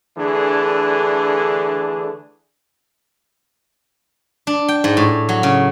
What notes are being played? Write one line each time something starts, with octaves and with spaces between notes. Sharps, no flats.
D3 E3 A3 D4 G#4
D4
G5
G#2
A2
F#3
C#3